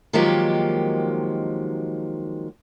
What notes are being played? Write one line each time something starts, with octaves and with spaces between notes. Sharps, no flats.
D#3 F3 F#3 G#3 A#3 G4